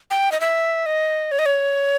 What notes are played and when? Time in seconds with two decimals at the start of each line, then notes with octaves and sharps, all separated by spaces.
0.11 G5
0.32 D#5
0.40 E5
0.86 D#5
1.32 C#5
1.39 D#5
1.46 C#5